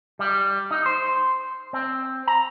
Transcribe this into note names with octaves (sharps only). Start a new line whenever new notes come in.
G3
D#4
C5
C4
A#5